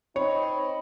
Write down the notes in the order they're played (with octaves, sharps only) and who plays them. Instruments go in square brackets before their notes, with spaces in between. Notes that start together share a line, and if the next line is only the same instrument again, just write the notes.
[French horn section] C4 D#4 D#5 [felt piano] C#5 [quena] B5